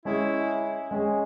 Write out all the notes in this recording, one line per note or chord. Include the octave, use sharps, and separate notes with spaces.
G#3 C#4 E4 G#4
G#3 C#4 G#4